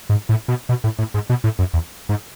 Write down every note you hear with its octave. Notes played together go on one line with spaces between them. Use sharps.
G#2
A2
B2
B2
A2
A2
G#2
B2
A2
F#2
E2
G#2